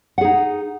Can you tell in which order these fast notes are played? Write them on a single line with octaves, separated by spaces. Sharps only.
F#5 G#4 D#4